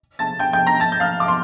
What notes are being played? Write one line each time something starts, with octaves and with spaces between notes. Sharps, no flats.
A5 A6
G5 G6
G5 G6
A#5 A#6
A5 A6
G6
F5 F6
D6
C6